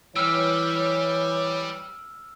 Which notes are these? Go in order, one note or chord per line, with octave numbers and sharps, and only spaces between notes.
E3 G3 G4 C#5 E6 F6